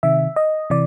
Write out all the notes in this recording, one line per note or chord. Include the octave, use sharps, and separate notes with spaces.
C3 D#3 E5
D#5
C3 E3 D5